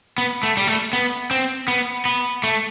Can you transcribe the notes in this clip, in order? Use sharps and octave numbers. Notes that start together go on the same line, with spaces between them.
B3
A3
G3
A3
B3
C4
B3
B3
A3